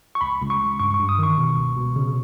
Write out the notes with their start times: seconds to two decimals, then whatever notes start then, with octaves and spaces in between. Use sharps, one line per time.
0.15 C#6
0.21 C#2 B5
0.41 C#2
0.50 C#6
0.60 C#2
0.80 G2 C#6
0.94 C#6
1.00 G2
1.09 D#6
1.18 D#3 C#6
1.38 B2
1.58 C#2
1.77 B2
1.96 C#3